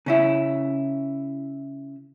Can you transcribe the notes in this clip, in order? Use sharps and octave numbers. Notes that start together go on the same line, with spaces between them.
C#3 C#4 E4